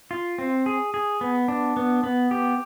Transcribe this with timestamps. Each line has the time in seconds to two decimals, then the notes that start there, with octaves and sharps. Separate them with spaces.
0.11 F4
0.38 C4
0.66 G#4
0.94 G#4
1.21 B3
1.48 D4
1.77 B3
2.04 B3
2.31 G4